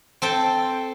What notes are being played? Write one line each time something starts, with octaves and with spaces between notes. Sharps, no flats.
C4 A4 G5